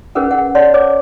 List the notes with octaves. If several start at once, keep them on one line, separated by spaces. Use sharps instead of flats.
C#4 G#4 A#4 B4 F#5
F#5
C#5 D5 F#5 A5 C6
C5 C#5 D6